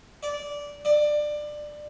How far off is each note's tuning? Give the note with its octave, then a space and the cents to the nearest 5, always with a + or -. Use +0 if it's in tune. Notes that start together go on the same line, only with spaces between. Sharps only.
D5 -15
D5 +20